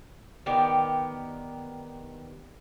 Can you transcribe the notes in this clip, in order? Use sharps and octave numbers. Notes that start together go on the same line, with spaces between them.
D#3 B3 G4 D5